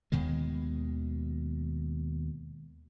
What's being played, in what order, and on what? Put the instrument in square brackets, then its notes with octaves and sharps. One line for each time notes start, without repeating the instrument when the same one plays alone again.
[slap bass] D#2 B2 D#3 G#3